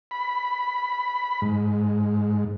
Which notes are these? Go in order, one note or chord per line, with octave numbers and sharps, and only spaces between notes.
B5
G#2